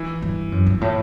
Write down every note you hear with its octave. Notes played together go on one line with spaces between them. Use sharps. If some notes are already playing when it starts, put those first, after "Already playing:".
Already playing: E3
G2
F#2
G2
A2